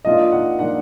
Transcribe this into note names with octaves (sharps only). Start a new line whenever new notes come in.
F3 A#3 D4 F4 D#5
F#5
F3 A#3 D4 F4 F#5